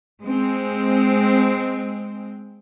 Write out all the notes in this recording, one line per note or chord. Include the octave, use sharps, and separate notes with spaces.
G#3 C4